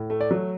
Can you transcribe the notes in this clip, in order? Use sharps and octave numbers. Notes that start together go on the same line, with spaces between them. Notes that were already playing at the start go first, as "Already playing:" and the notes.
Already playing: A2
A3
D5
F#3